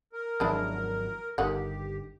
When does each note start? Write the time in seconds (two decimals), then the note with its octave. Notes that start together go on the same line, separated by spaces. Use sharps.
0.13 A#4
0.40 G#1 F3 F#3 G#3 D4 E4
1.38 G1 D#3 G4 F#5